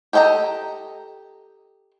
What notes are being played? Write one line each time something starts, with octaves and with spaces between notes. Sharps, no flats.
G4 A4 D#5 G5 A#5